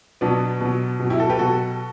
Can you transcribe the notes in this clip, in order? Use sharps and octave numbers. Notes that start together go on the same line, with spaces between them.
B2 F#3 B3 D4
B2 F#3
B2 F#3
E4 G4
F#4 A4
G4 B4
B2 F#3 F#4 A4